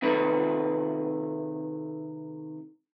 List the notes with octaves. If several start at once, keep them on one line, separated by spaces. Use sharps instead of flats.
C3 D#3 A3 B4